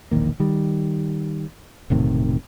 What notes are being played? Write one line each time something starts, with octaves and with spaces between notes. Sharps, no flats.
E1 A#1 D#3 A#3
D#3 G3
E1 A2 C3 D#3